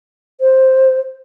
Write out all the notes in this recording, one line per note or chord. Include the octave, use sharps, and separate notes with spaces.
C5